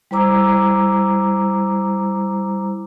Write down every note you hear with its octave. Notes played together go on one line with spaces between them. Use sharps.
G3 E4 C5 A#5 D6 E6